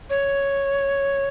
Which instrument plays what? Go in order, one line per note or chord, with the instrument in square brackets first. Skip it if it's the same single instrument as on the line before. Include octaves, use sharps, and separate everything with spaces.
[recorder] C#5